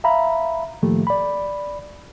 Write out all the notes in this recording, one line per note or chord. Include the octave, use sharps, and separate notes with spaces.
E5 F5 A#5 B5
A2 D#3 F3 A3 A#3 G4
D5 B5